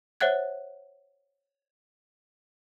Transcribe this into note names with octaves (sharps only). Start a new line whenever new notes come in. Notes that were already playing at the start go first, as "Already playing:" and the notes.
C5 C#5 E5 F#5 F#6 G#6